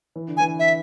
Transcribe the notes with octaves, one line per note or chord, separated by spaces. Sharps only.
E3
D3
G#5
E3
E5